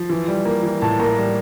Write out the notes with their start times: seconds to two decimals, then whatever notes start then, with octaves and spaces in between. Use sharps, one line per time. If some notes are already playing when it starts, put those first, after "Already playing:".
Already playing: F3
0.10 E3
0.28 G3
0.45 A#3
0.63 E3
0.82 A2 A5
0.99 A#3 A#5
1.17 G3